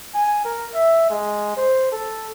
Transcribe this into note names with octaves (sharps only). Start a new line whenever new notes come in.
G#5
A#4
E5
G#3
C5
A4